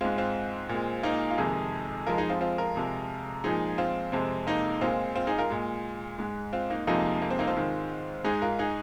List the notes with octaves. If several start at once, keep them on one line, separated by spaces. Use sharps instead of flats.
G#2 G#3 C4 F4
C4 F4
A#2 G#3
A#3 D#4
F4
F2 C3 D#3 G#3 D#4 G#4
F2 F3 G#3 F4 A#4
D#4 G#4
C4 F4
C4 F4
F4 A#4
F2 C3 G#3
A#2 F3 G#3 D#4 G#4
C4 F4
F2 C3 G#3 C4
A#3 D#4
A#2 G#3 C4 F4
C4 F4
D#4 G#4
F4 A#4
A#2 G#3
G#2 G#3
C4 F4
A#3 D#4
F2 C3 F3 G#3 A#3 D#4
A#3
C4
A#3 D#4
C4 F4
G#2 D#3 G#3
G#2 G#3 D#4 G#4
F4 A#4
D#4 G#4